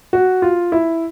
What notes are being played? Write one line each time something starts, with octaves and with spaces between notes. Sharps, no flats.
F#4
F4
E4